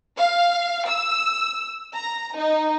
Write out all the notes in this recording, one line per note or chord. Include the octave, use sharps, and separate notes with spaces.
F5
E6
A#5
D#4